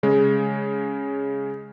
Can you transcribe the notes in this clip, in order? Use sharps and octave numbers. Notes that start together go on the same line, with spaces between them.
C#3 G#3